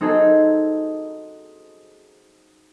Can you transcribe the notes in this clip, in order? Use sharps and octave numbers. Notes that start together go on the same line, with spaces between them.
C4 D#4 F#4 G#4 A4